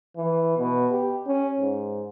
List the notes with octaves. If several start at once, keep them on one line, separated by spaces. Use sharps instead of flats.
E3
B2
G4
C#4
G#2